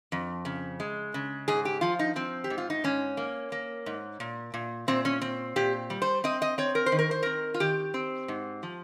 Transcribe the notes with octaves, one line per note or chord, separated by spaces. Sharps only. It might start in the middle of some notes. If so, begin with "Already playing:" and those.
F2
C#3
G#3
C#3
G#2 G#4
G4
F3 F4
D#4
F3 C4
G4
G#2
F4
D#4
G#2 C#4
A#3
A#3
G#2
A#2
A#2
A#2 C4
C#4
C4
A#2 G4
G3
C5
C4 D#5
D#5
C4 C#5
A#4
C5
D#3
A#4
C5
C4 A#4
F4
D#3 G4
C4
G#2
F3